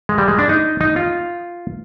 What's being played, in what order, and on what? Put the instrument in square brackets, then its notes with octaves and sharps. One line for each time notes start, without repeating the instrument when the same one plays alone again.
[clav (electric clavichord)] G#3
G3
G#3
D4
D#4
D#4
F4